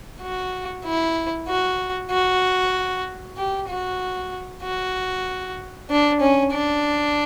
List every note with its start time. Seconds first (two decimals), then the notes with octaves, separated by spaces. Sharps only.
0.22 F#4
0.84 E4
1.48 F#4
2.11 F#4
3.37 G4
3.68 F#4
4.63 F#4
5.90 D4
6.21 C#4
6.52 D4